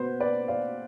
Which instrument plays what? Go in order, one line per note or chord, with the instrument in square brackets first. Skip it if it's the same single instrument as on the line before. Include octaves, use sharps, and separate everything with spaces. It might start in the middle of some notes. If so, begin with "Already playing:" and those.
Already playing: [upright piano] B2 B3 B4 C5
B4 D5
D5 F5